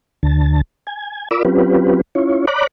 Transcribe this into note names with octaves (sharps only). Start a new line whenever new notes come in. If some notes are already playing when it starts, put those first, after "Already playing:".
D2 D3 A5
G#5
F4 A#4 D5 B5 D6 E6
F#3 C4 C#4 F4 G4 B4
C#4 E4 F4 C#5
C#5 D5 A#5 B5 D6 F#6